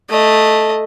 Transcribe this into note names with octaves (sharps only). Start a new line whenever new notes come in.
A3 D#5